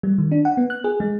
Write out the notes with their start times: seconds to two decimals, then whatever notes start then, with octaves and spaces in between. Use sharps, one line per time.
0.03 G3
0.18 D#3
0.31 D4
0.45 F#5
0.57 B3
0.70 F#6
0.84 G#4
1.00 G#3